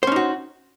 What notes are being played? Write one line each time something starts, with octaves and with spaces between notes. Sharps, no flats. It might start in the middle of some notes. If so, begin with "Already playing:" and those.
C#4 D#4 F#4 C5